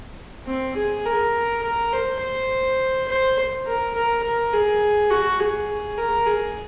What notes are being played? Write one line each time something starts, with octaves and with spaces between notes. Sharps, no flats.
C4
G#4
A#4
A#4
C5
C5
C5
A#4
A#4
A#4
G#4
F#4
G#4
A#4
G#4